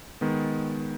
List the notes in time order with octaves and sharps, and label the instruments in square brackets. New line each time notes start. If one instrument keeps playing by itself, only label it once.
[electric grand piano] D#3 G#3 B3